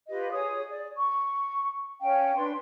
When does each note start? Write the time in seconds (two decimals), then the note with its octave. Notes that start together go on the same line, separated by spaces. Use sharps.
0.09 F4 G4 B4 D#5
0.32 G#4 C#5 D#6
0.70 D5
0.97 C#6
2.01 C#4 F5 G5
2.37 D4 B4 G5 C6